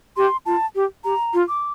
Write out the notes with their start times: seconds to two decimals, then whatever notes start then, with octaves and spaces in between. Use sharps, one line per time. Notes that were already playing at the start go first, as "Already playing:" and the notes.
0.17 G4 C6
0.46 F4 A5
0.75 G4
1.04 G4 A#5
1.34 F4
1.48 D6